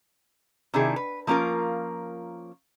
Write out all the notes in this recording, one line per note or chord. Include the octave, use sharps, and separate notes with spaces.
C3 D#3 D4 E4 G#4
B4
F3 A#3 C#4 F4 A#4